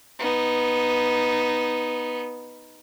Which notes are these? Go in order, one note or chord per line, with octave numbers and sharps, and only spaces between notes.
B3 D#4